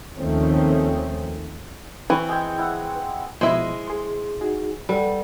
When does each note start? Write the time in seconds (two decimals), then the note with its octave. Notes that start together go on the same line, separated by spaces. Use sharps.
0.17 D#2 D#3 F3 A3 C4 C#4
2.10 E3 C4 C#6
2.29 G#3 G#4 G5
2.58 E4 F#5
3.41 B2 F3 G#3 E4 C5 D#5
3.88 G#4 C6
4.41 D#4 F#4 G#4
4.89 G3 A4 B4 F#5